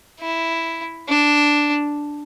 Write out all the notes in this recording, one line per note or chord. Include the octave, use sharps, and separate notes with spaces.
E4
D4